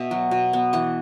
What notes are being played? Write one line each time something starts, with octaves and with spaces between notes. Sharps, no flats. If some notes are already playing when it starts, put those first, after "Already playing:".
Already playing: B2 E5
F#3
B2
B3
E3 F#5